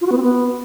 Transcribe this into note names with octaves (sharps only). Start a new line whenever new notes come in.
F4
F#4
B3
C4
B3